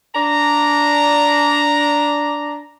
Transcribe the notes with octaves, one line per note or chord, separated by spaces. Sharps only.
D4 A#5